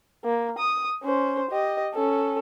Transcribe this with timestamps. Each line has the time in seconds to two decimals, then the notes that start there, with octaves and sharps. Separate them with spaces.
0.24 A#3
0.58 D#6
1.03 C#4 C5
1.51 G4 D#5
1.94 C#4 A4